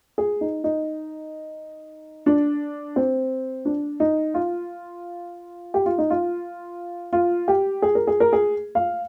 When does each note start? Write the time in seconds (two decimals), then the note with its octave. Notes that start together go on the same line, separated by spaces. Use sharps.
0.18 G#4
0.41 D#4
0.64 D#4
2.26 D4
2.96 C4
3.65 D4
4.00 D#4
4.34 F4
5.74 G4
5.86 F4
5.98 D#4
6.10 F4
7.13 F4
7.48 G4
7.82 G#4
7.95 A#4
8.07 G#4
8.20 A#4
8.33 G#4
8.75 F5